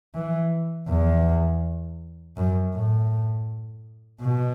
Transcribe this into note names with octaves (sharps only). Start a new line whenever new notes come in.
E3
E2
F#2
A2
B2